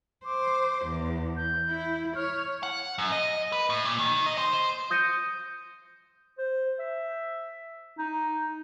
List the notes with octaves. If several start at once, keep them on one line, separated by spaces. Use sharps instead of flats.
C5 D6
E2
G6
E4
C#5 F6
F#5
F#2
D#5
B4
A2
A#2
D#3
D#5
C5
C5
D#6 G6 A#6 C#7 D#7
C5
E5
D#4